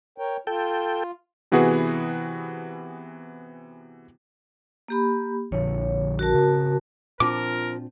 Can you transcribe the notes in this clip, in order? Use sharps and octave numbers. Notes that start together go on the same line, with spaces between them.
A#4 C#5 G5
F4 A4 G5
C3 E3 B3 F#4 G#4 B4
A#3 G4 B5
A#1 D3 F3 C#5
F#4 A#4 A5
C#3 C4
A#2 F3 C4 D4 A#4 D6